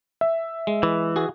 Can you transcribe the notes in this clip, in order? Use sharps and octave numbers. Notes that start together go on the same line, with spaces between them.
E5
G#3
E3
F#4 G#4